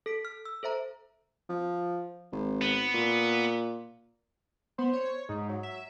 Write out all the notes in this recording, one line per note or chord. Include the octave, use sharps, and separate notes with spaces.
A4 B6 D7
F6
E6
A4 C5 E5 A#5
F3
G#1
B3
A#2
B3 C5
C#5
G#2 D#4
F#3
E5